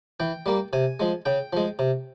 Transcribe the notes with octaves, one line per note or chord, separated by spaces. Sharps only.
E3 G5
G3 A#3
C3 G#5
F3 G#3
C#3 G5
F3 G#3
C3